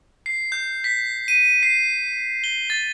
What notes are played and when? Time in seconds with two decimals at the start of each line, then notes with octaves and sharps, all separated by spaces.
0.26 C7
0.52 G6
0.84 B6
1.28 D#7
1.63 C7
2.44 G7
2.70 A6